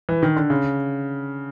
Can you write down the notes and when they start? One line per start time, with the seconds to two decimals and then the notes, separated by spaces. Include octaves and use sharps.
0.09 E3
0.23 D#3
0.36 D3
0.50 C#3